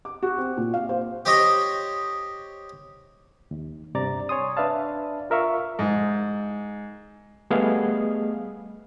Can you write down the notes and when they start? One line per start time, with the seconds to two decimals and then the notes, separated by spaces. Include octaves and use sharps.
0.05 D6
0.23 F#4
0.38 C4
0.57 A#2
0.74 F5
0.89 C5
1.25 G4 C5 C#5 D#5
3.51 D#2
3.95 G2 C3 D5 A#5 A6
4.29 C#5 G#5 C6 D#6
4.57 D4 B4 D5 E5 F5 A5
5.30 F4 A#4 E5 F5 C#6
5.79 G#2
7.50 G3 A3 B3 G#4 D#5 F5